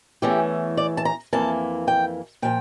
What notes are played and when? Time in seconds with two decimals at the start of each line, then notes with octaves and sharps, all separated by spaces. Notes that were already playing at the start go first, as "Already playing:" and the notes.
0.22 E2 E3 A3 C#4 G4
0.77 D5
0.97 A5
1.05 A#5
1.33 F2 E3 A#3 A5
1.88 G5
2.42 A#2 F3 G5